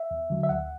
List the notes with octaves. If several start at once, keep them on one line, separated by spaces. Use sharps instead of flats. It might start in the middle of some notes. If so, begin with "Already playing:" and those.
Already playing: E5
E2
D3 F#3
E5
D2 F#5